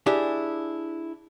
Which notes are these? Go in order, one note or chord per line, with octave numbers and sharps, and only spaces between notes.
D4 E4 G4 G#4